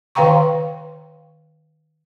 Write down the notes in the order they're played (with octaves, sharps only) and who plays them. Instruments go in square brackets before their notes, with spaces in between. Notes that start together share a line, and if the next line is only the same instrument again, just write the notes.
[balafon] D#3 B4 F5 G5 A#5 C#6